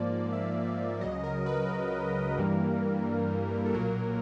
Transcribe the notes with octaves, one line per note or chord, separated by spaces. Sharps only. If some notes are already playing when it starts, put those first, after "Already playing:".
Already playing: G#2 F3 A#3 D5
E5
C#2 C#3 F#3 D#5
A#4
B4
A#4
G2 E3 G3 A#3
A4
B1 A#2 F#3 A#3 A#4